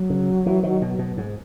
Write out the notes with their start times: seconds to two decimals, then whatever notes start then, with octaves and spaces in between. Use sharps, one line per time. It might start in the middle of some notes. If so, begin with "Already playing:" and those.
Already playing: F#3
0.10 C#3
0.46 E3
0.63 D#3
0.82 B2
0.99 B2
1.17 G#2